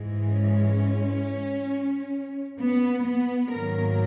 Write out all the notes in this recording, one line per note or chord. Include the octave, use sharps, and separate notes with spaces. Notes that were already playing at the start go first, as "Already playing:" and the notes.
Already playing: G#2 E3 G#3
C#4
B3
B3
G#2 D#3 F#3 A#3 A#4